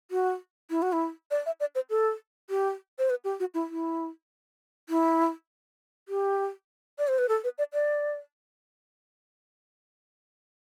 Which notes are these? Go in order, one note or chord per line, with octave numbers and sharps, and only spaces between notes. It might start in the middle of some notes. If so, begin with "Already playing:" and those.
F#4
E4
F#4
E4
D5
E5
D5
C5
A4
G4
C5
B4
G4
F#4
E4
E4
E4
G4
D5
C5
B4
A4
B4
D5
D5